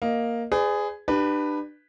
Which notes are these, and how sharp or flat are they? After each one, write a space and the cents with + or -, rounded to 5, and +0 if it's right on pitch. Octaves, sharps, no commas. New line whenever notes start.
A#3 +0 D#5 +0
G#4 +0 B4 +40 D5 +0
D4 +35 G4 +0 B4 +0